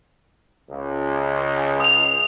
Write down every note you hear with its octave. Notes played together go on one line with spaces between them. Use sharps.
C#2
D#6 F7